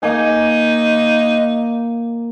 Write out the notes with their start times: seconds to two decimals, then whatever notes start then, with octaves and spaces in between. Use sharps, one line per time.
0.03 A#3 D#4 G#5